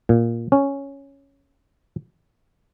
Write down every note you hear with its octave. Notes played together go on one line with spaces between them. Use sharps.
A#2
C#4